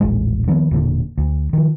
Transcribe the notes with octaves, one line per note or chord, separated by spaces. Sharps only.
D#1 A1 G#3
D#3 F3 A#3 B3
E1 A#2 D3
D2
D#3 F3